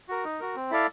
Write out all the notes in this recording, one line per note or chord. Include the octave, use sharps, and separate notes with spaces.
F#4 A#4
D#4
F#4 A#4
C4
E4 A4 D5 F5